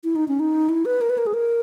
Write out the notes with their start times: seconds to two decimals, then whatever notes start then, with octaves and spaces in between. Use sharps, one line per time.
0.04 E4
0.16 D#4
0.28 C#4
0.40 D#4
0.69 E4
0.85 B4
1.01 A#4
1.10 B4
1.18 A#4
1.27 G#4
1.34 A#4